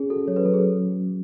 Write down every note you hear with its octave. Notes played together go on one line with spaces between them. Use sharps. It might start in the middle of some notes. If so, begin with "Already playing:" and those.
Already playing: C#4 G#4
F#4 A4
F#3 C#5
B4
F#3 A4
G#4